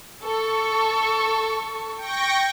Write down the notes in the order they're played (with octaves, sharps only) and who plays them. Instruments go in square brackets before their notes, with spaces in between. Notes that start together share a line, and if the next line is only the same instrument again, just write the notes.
[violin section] A4 C#6
[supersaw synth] G5 C#6 A#6